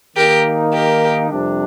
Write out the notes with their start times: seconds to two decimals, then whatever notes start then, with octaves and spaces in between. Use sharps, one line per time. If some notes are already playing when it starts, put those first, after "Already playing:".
0.16 D#3 A#3 D#4 G4 A#4
0.74 G4 A#4
1.30 F2 C3 G3 D4